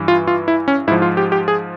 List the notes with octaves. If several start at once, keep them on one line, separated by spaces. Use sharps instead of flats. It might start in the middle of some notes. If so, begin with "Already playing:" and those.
Already playing: G2 E3
F4
F4
E4
C#4
G#2 F3 E4
F4
G4
G4
G#4